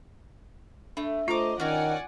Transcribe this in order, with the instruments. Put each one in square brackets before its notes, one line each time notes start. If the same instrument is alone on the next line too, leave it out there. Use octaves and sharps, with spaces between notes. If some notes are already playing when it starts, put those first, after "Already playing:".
[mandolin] A3 [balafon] D4
[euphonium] A3 [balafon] F4 [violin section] C5 D#5 [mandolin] A#5 D6
[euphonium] D#3 [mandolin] C#4 F#4 [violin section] D5 F#5 G#5